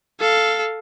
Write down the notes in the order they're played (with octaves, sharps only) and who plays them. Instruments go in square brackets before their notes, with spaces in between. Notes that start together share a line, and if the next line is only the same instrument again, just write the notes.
[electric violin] A4 F5